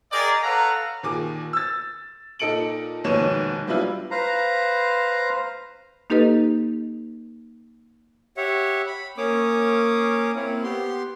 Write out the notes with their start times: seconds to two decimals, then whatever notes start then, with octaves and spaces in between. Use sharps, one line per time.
0.12 G#4 A#4 D5 D#5 G5 A#5
0.42 A4 B4 C#5 F5 F#5 A#5
1.03 D#2 A#2 G#4 D6
1.53 E6 A6
2.39 A#2 D#4 A4 C#7 D7 F#7
3.04 F1 D#2 G#2 B2 C#5 E7
3.67 F#3 G3 B3 D4 E4 F4
4.11 B4 C5 F5 A#5
6.10 A#3 D#4 G4 A4 B4 D#5
8.37 G4 C#5 E5 F#5
8.86 B5
9.18 A#3 C#4 C#5 D6 D#6
10.36 A#3 C4 E4 C#5
10.63 B3 G4 C6